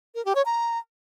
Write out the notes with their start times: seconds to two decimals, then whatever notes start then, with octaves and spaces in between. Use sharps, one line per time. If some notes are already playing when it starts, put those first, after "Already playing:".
0.15 A#4
0.25 G4
0.35 C#5
0.46 A#5